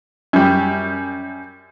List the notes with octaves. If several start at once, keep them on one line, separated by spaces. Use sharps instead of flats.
F#2 G3